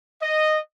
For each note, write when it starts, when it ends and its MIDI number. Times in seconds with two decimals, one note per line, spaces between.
0.22 0.59 75